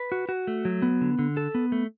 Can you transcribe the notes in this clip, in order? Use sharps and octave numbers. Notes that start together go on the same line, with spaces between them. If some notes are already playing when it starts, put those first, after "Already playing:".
Already playing: B4
F#4
F#4
A3
F#3
B3
D3
D3
A4
B3
A3